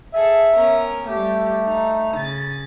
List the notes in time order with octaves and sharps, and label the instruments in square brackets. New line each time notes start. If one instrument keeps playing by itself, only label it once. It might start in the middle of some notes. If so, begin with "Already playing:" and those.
[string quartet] G#4 A4 [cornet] E5
[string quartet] B3 C#4 A#4
[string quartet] G3 G4 [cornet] A3
[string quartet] D#4
C#3 A6